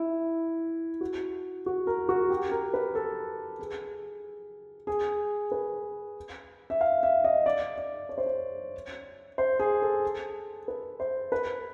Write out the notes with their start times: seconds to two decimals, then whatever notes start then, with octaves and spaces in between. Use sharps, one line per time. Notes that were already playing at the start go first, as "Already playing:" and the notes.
Already playing: E4
1.01 F#4
1.66 F#4
1.87 A#4
2.09 F#4
2.30 G4
2.51 A#4
2.74 B4
2.95 A4
3.60 G#4
4.87 G#4
5.52 B4
6.70 E5
6.81 F5
7.03 E5
7.24 D#5
7.46 D5
7.78 D5
8.09 C#5
8.18 C5
8.26 C#5
9.38 C5
9.60 G#4
9.82 A4
10.68 B4
11.00 C5
11.32 B4